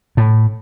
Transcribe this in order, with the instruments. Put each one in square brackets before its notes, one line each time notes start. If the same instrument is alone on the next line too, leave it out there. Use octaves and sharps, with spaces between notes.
[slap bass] A2